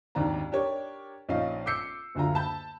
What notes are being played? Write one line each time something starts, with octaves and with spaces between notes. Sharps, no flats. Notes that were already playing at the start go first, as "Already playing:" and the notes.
G#1 D#2 D4 D5 A#5
D4 G4 A#4 C#5 D5
A#1 C#4 D#4 F5
D6 E6 G6 C7 C#7
F#1 D2 D3 F4 A#5
A5 B5 G6